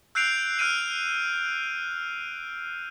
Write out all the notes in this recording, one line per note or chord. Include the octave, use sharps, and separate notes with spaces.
E6 F#6 G6 C7 D7 F7
F6 F#6 C7 D7 D#7